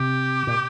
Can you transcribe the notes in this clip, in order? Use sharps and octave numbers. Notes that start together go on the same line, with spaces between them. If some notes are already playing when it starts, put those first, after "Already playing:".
Already playing: C3 G4
A#2